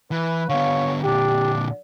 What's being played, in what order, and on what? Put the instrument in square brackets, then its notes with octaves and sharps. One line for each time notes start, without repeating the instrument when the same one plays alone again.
[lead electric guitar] E3 [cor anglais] B4
[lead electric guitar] D3 B3 [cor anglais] C#5 [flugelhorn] F5
[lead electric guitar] A#2 D3 [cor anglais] D4 [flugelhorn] G4